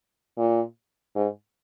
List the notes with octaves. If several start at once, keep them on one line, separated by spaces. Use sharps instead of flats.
A#2
G#2